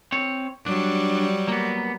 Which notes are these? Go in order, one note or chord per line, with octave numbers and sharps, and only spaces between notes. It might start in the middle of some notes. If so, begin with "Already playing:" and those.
C4 C#5
F#3 G3 D4
A#3 B3